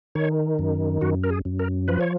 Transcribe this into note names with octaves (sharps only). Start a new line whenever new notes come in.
D#3 C#5
F#2
F#2 F#4
A#4
G#4
F#2
A#4
F3 B4
C#5